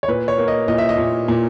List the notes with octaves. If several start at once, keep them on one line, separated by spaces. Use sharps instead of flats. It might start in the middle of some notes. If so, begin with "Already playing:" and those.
C#5
A#2 B4
C#5
A#3
D#5
A#2 D#5
E5
D#5
A#2
A#2